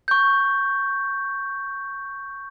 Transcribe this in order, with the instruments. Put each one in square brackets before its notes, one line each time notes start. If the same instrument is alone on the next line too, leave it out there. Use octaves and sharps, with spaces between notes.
[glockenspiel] C#6 G6